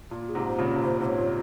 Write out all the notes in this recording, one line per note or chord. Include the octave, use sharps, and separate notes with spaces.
A#2 F4
G#4
G#2 C3
C5
A#2 C#3
C3
A#2 C#3 C5
G#2 C3 C5
C#5
A#2